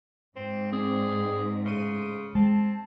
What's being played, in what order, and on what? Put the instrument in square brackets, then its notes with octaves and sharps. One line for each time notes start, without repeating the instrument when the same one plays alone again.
[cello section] G#2 [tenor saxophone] C4
[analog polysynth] C4 D5 [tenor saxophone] G#4
[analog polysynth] A2 C6 D#7 [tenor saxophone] C#3
[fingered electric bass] G#3 [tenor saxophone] C4 [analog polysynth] A5